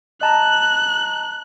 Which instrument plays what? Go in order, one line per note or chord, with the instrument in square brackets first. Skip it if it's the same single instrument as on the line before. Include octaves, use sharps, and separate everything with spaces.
[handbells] D#5 A5 A#5 [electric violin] F#6